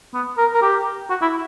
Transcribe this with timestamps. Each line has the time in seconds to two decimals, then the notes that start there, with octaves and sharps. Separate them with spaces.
0.14 B3
0.38 A#4
0.54 A#4
0.62 G4
1.10 F#4
1.22 E4